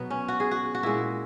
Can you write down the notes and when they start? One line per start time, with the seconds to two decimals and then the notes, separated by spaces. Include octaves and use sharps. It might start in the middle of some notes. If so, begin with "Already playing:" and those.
Already playing: B2 F#3 B3
0.10 C#4
0.28 F#4
0.40 G#4
0.51 F#4
0.75 F#4
0.83 A#2 G#3 E4